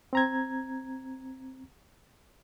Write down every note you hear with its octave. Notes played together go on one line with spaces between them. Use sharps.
C4 A#5 G#6